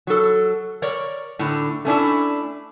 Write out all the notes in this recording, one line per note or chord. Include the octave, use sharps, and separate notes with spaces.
F#3 A4
A#4 C#5 D5
A2 D3
A3 C#4 D4 E4